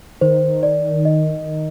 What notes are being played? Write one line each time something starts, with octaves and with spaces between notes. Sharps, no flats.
D#3 C5
D5
D#5